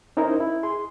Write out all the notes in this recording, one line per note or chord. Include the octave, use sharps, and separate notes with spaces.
C#4 D#4 E4 A#4 C5
E4
G#4 C6